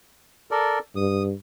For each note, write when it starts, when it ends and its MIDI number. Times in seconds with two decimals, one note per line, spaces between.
0.51 0.79 69
0.51 0.79 70
0.51 0.79 74
0.96 1.32 43
0.96 1.23 87